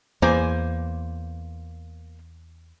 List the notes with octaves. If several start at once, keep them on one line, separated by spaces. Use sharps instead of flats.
E2 A#3 C5 G#5